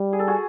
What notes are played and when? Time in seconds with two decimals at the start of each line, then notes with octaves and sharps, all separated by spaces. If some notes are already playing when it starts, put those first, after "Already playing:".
Already playing: G3
0.13 G#4
0.19 A4
0.27 F#4 G#4